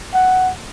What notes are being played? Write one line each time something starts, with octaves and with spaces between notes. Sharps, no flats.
F#5